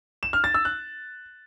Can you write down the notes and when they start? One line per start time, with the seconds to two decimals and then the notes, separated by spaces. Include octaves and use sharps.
0.23 E7
0.33 F6
0.44 A6
0.54 E6
0.65 F#6